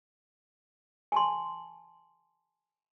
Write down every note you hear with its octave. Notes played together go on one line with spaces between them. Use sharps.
G#5 A5 C6